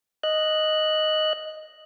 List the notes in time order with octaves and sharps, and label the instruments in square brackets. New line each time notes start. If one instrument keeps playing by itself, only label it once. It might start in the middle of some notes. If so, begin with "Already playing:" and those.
[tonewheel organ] D#5 F#6